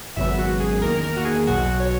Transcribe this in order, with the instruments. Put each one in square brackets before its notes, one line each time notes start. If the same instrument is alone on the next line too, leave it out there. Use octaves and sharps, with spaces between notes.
[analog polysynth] G#1 F#2 C#3 F#3 B3 E5
F#4
G#4
E2 D#3 A#3 A#4
A#4
F#4
G#4
B1 B2 F#3 F#4
C#5